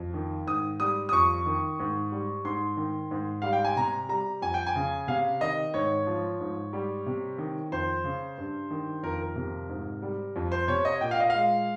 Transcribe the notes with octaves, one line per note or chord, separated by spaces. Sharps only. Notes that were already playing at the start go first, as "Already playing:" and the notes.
Already playing: F2
D#3
G#2 D#6
G3 D#6
D#6
F2 C#6
D#3
G#2
G3
G#2 C6
D#3
G#2
G3 F5
G5
G#5
C3 A#5
G3 A#5
F2 G#5
G5
G#5
C#3
C3 F5
D#3 D#5
G#2 C#5
F3
G#2
G3
C3
D#3
F2 C5
C#3
G2
D#3
F2 A#4
A#4
C3
G#2
G3
F2
C5
C3 C#5
D#5
A#2 G5
F5
D#5
G#3 F5